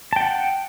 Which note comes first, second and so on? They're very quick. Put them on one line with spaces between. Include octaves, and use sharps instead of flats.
A5 G5 F#5